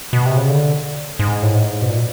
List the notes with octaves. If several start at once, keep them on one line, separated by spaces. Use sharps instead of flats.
B2
C3
C#3
D3
G#2
A2
G#2
B2
A#2